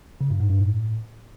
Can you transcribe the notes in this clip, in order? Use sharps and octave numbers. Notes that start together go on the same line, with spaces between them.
C#3
G2
G#2
G2
A2